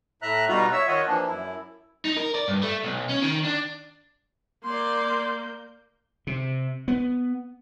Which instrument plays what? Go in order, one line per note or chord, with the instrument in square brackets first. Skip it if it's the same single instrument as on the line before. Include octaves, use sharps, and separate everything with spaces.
[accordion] A2 E5 A#5 F#6
B2 G3 D#4 F4 F#4 A#5
C#5 E5 E6
D#3 F4 C#5 D#5 F#5
E3 F3 A#3 D4
F#2 E4
[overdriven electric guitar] D#4
A#4
D5
G2
A3
B1
C#4
D#3
D4
[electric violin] A#3 G6 [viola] D5 C6
[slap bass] C3
B3